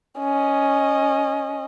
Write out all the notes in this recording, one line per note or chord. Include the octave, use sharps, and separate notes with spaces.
C#4 D#5